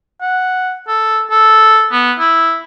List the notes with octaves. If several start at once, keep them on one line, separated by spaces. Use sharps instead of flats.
F#5
A4
A4
B3
E4